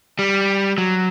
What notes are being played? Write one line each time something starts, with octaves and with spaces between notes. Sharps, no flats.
G3
F#3